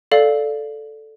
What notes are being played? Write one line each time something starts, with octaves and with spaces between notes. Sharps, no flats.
A4 D5 F5